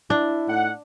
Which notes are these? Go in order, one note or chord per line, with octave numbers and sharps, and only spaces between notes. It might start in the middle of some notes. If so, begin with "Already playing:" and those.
D4 E4
A2 D#4 F#5